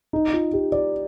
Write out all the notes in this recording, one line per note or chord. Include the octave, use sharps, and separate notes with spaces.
D#4
F4
G4
D5